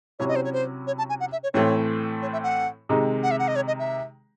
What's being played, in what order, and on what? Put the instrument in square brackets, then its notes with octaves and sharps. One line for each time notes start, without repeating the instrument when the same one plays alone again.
[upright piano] C3 F#3 C#4 E4 [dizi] C#5
[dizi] D#5
C5
C#5
C5
C#5
A5
G#5
F#5
E5
C#5
[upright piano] A2 E3 A3 C4 [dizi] C#5
[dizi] C#5
E5
F#5
[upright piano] C3 D#3 G#3 D#4
[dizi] F#5
E5
F#5
D#5
C#5
D#5
E5